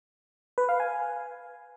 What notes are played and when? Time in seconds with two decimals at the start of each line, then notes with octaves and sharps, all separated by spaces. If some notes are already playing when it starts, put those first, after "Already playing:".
0.58 B4
0.69 F5
0.80 G#5